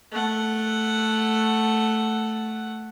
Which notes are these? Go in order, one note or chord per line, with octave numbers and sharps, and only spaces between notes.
A3 F#5